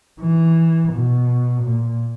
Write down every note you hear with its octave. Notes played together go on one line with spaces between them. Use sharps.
E3
B2
A#2